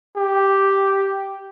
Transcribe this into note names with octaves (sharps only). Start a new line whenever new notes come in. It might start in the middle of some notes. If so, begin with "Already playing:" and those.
G4